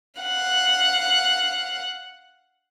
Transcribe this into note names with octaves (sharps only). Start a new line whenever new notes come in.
F5 F#5